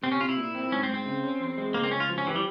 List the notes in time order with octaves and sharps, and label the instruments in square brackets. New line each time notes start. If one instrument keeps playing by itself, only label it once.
[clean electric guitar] C3 [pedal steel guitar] C4
[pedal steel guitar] C#4
[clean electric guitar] C3 [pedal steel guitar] F4
[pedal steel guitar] E4
[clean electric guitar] A#2
C4
[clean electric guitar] G#2 [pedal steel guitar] C#4
[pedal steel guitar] C4
[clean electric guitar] G#2
[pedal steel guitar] C4
[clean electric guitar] C#3
C#4
E2
G#3
[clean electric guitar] C#2 [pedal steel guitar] A#3
[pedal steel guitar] C4
[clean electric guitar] C#2 [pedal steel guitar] C#4
[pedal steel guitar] F4
[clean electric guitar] F3
[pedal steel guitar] C#4
[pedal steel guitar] E3 [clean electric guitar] G4
[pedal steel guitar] G3